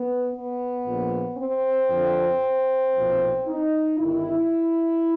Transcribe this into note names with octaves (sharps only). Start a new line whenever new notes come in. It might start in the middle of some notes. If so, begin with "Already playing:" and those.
Already playing: B3
B3
A#1 A#2 F3
C4
F2 D3 F3
B1 A#2 F3
D#4
G1 G2 D#3 E4